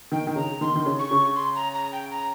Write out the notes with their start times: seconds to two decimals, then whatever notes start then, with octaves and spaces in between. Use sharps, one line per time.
0.12 D#3 G5
0.27 D#3
0.36 C#3 A#5
0.61 D#3 C6
0.75 D#3
0.86 C#3
0.99 C#6
1.11 C#3
1.36 C6
1.55 A#5
1.74 A#5
1.92 G5
2.11 A#5